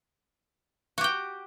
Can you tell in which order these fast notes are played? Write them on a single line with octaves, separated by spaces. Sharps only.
F#4 G4 G5